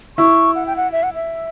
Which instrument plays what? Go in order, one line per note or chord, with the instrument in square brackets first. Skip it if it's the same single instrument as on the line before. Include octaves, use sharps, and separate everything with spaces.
[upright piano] E4 [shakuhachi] C#6
[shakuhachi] F#5
G5
F#5
E5
F#5
E5